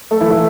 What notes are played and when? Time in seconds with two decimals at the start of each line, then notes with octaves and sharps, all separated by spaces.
0.11 A3 A4
0.20 E3 E4
0.31 E3 E4